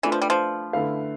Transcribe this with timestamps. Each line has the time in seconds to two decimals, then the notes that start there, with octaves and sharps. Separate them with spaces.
0.03 E3 A3 D4 F4 B4
0.12 F3
0.22 G3
0.30 F3
0.73 D3 A3 E4 B4 F5